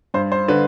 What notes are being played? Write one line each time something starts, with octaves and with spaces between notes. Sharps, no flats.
G2 C5
C5
D3 B4